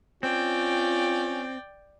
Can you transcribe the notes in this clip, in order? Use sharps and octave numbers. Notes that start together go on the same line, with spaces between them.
C4 C#4 F4 D5 G5